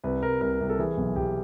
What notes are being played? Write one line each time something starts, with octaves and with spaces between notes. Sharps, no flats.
C2 B4
C2 A#4
C2 A#4
C2
A4
E3 G#4
B1
B1 G4